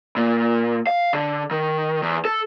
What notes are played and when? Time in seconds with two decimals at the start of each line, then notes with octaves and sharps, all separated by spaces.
0.17 A#2
0.87 F5
1.13 D3
1.51 D#3
2.03 E2
2.25 A4